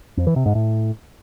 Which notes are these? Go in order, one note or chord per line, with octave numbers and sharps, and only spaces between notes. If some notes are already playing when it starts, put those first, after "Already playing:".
F2
E3
C3
G#2
A2